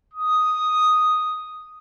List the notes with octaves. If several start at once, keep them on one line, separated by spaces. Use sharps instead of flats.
D#6